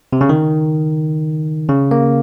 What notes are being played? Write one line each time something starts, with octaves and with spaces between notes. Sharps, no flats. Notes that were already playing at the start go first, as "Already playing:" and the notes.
C3
C#3
D#3
C#3
A#3